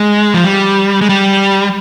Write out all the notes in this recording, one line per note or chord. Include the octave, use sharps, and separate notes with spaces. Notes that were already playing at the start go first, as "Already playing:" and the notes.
Already playing: G#3
F3
G3
G#3
G3